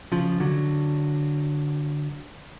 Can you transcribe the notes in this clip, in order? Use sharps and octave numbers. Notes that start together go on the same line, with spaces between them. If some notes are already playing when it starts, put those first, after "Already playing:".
C#3 F3
D3 F#3